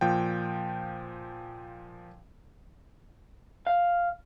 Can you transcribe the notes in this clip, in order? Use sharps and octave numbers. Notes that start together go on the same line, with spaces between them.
A#2 F3 G5
F5